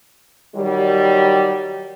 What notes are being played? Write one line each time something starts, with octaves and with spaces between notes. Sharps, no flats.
D#3 F#3 G3